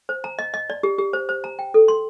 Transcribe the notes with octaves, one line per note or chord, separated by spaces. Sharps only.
C5
A#5
D#5
D#5
D5
G4
G4
C5
C5
A#5
G5
A4
C6